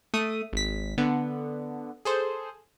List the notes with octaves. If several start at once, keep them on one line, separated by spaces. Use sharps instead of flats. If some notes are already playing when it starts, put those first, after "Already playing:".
A3 D#6
G#1 B6
D3 B3
G#4 A4 C5